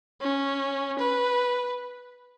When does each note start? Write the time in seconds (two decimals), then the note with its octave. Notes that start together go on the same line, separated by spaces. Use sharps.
0.21 C#4
0.99 B4